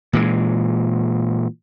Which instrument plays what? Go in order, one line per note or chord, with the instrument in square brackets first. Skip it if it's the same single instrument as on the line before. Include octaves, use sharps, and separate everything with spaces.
[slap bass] A#2 E3 G#3